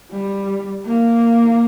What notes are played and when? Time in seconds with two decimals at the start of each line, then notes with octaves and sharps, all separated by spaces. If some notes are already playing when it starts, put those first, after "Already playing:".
0.11 G3
0.86 A#3